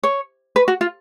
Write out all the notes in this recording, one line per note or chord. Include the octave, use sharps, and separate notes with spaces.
C#5
B4
F#4
F4